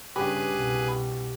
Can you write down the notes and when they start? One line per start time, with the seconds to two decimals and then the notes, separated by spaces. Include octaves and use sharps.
0.16 G2 C#3 G4 G#4 B4
0.51 C2 B2